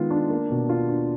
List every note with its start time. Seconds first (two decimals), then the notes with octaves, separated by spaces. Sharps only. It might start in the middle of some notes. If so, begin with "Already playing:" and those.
Already playing: D#3 G#3 B3 F4
0.11 D4
0.30 A#3
0.50 B2
0.69 F4
0.89 D4